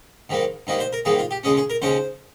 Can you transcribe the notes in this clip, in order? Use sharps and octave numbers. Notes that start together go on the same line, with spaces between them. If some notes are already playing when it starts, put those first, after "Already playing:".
G#2 D#3 G3 A#3
G#2 D#3 G3 A#3 D#4
C5
A#4
G#2 D#3 G3 A#3 G#4
F4
G4
D#2 C#3 G#3 C#4 G#4
G#4
A#4
D#2 C#3 G#3 C#4 C5